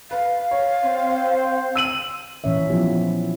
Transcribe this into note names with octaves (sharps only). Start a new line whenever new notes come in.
B4 F5
C#5
C4 C5
E6 D#7 F#7
A#2 E3 C#4 C#5 E5
F3 F#3 B3 E4 F4 G4